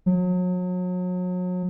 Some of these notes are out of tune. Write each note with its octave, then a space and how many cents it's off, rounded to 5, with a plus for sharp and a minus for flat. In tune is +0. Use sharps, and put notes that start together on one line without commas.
F#3 -35